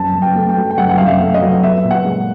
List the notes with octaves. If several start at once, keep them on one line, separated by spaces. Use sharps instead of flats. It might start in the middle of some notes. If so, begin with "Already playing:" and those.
Already playing: F#2 A5
F#2
G5
A3
G5
F#3
G5
F#2 F#5
F#5
F#2 F5
E5
A3
D#5
F#3
B3 E5
A#2
F#5
G#3